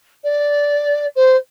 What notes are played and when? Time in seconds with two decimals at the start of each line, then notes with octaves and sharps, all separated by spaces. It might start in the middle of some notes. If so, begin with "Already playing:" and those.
0.24 D5
1.15 C5